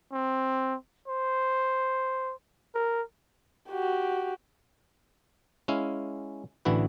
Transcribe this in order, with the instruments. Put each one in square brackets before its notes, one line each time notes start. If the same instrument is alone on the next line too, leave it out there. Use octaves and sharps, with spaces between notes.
[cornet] C4
C5
[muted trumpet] A#4
[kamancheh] F#4 G4
[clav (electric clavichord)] G#3 C#4 E4 F5
A1 D3 E3 E4 F#4 B4